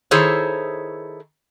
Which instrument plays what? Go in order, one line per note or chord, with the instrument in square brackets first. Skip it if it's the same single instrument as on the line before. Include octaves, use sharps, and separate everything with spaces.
[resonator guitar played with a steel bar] D#3 E4 G#4 A4 C5 C#5